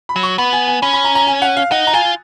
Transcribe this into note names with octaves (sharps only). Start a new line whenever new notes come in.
B5
F#3
C#6
B3 B5
G#5
G#5
C#4 B5
B5
A#5
A#5
G#5
F#5
F5
D#4 F#5
A#5
F4 G#5